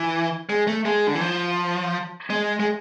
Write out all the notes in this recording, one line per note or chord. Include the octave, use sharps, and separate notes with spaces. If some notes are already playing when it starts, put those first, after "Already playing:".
Already playing: E3
G#3
A3
G#3
D3
E3
F3
G#3
G#3